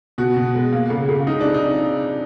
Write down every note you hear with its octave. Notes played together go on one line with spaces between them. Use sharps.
B2 F#4
B2
G#3
A#3
C#3
C#3
G#3 D#4
C3 D4
D#4